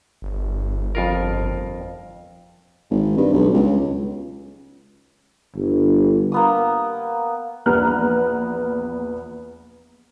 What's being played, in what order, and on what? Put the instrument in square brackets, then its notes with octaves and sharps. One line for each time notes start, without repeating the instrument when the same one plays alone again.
[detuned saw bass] G1
[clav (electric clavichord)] F2 F4 A#4
[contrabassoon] G#1
G2
B1
C#2
[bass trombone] G1
[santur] A#3 B3 D#6
[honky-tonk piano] A#1 E2 B3 A#5 F6 F#6